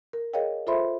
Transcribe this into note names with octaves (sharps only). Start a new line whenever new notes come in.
A#4
G#4 A#4 C#5 D#5 F5 G5
F4 A4 C5 E5 B5 C6